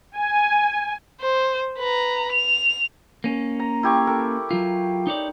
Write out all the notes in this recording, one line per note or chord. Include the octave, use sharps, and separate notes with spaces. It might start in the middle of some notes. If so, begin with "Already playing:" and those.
G#5
C5
B4 A#5
F7
A#3 C#4
A#5
E4 G4 C#6
A4 A#4
F#3 F4
D#4 C#5 D5